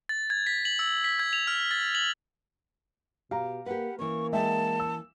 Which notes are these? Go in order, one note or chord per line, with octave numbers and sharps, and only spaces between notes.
A6
G#6
B6
F#7
E6
B6
G#6
F7
F6
A6
F#7
B2 G4 F5 A#5
A#3 G4 B4 F#5
E3 A#3 C#4 C#6
G#3 E5 G5 A5
E6